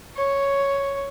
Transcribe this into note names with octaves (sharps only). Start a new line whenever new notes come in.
C#5